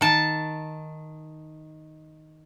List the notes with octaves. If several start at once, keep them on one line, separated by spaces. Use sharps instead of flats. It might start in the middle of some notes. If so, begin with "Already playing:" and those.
D#3 A5